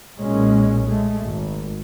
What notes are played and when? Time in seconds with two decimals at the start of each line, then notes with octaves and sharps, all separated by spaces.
0.18 B1 A#2 G#3 C#4
0.85 G#3 A3
1.22 G#1